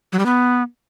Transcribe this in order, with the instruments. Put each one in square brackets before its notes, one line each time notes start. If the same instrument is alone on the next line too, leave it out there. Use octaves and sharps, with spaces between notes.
[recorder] F#3
G3
B3